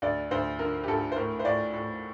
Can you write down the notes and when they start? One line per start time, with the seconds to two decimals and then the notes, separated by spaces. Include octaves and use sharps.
0.02 D2 D5
0.31 D2 C5
0.59 D3 A#4
0.83 G4
0.88 D2 A4
1.12 C5
1.16 A2 A#4
1.39 C5
1.45 A2 D5
1.73 A2